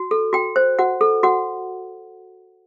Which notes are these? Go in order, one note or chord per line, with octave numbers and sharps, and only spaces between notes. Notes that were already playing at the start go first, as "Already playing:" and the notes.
Already playing: F#4
A4
F#4 G5
C5
F#4 F#5
A4
F#4 F#5